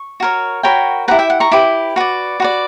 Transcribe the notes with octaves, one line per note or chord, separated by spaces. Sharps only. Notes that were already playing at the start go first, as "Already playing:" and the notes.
Already playing: C#6
F#4 A#4 C#5
F#4 A#4 C#5 G5 B5
E4 G4 B4 F#5 A#5
E5 G5
F#5
A#5 C#6
E4 G4 B4 B5 D6
F#4 B4 D5
F#4 B4 D5